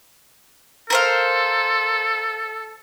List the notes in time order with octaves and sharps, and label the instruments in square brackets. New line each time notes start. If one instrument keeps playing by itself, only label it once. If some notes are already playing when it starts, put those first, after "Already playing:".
[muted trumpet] A4 [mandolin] A#4 C5 F5